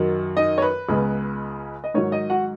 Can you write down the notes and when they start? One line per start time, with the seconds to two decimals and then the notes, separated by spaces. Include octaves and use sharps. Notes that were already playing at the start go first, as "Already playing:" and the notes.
Already playing: F#2 D#3 F#3
0.37 D#4 D#5
0.58 C#5
0.62 B4
0.89 C#2 C#3 G#3 B3
1.84 D#5
1.94 G#2 D#3 F#3 C#5
2.12 D#4 D#5
2.30 F#4 F#5